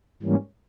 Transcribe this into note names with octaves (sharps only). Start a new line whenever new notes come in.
G#2 E3 G3 A#3 C#4